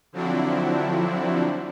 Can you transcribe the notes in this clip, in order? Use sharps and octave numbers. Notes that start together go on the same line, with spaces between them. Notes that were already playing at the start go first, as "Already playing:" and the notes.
D3 F3 F#3 C4 D4 E4